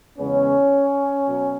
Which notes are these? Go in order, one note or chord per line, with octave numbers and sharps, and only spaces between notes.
E2 C#3 G#3 B3 C#4
B2 F#3